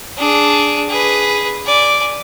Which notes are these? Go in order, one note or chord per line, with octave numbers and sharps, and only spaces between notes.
D4 G#4
G#4 B4
D5 G#5